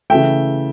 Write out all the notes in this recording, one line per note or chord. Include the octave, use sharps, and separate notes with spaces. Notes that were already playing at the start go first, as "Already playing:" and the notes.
C#3 E3 A3 E5 G5